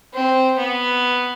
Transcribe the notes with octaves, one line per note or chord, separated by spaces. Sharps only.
C4
B3